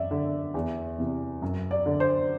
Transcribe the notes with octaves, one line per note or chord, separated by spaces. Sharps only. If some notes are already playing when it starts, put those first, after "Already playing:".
Already playing: F#2 D5 E5
D3
E2
C3 E3
F#2
D5
D3
C5